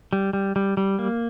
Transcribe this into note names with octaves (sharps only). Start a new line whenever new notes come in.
G3
G3
G3
G3
A#3